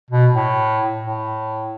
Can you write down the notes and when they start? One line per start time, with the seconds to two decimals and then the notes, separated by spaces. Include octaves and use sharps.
0.11 B2
0.34 A2
1.04 A2